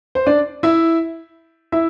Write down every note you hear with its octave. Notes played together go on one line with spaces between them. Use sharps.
C5
D4 D5
E4 E5
E4 E5